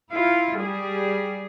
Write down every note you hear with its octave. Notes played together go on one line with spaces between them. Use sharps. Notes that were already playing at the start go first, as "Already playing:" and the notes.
E4 F4
G3 G#4